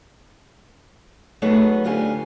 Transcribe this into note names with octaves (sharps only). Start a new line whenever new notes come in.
F#3 A3 B3 D#4 G#4 B4
D2 D3 F4 G4 G#5